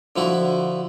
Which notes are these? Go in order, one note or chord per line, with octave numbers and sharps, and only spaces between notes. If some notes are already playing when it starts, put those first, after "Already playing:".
D3 F3 E4 F#4